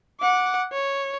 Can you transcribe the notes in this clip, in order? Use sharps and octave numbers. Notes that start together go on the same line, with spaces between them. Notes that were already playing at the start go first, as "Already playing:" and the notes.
F#5 D6
C#5